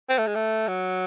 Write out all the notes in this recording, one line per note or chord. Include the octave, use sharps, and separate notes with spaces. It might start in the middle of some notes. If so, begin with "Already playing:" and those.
C4
A3
G#3
A3
F#3